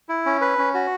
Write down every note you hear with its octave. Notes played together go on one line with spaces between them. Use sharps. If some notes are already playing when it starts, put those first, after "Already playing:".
E4
C#4
B4
C#4
F#4